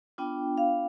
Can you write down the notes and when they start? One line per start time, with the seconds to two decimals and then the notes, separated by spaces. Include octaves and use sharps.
0.18 B3 D4 F4 G5
0.58 F5